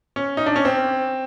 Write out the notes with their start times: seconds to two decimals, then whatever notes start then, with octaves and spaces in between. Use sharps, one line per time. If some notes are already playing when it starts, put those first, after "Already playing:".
0.16 C#4
0.37 D#4
0.46 D4
0.56 C#4
0.65 C4